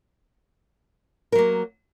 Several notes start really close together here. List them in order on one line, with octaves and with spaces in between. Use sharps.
A#4 F#3 A#3